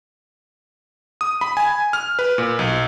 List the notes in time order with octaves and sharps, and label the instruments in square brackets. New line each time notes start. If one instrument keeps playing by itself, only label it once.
[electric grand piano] D#6
B5
G#5
F6
B4
A#2
B1